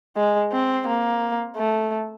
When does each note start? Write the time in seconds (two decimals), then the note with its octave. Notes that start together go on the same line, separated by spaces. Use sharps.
0.17 G#3
0.53 C4
0.87 A#3
1.56 A3